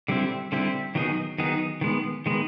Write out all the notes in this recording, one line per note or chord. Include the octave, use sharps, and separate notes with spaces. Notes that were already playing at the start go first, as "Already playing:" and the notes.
D3 G3 C4 E4 G4
D3 G3 C4 E4 G4
D#3 F#3 B3 D#4 G#4
D#3 F#3 B3 D#4 G#4
D#3 G#3 B3
D#3 G#3 B3